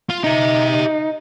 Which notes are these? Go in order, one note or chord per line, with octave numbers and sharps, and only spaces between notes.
F4
D#4 G4 E5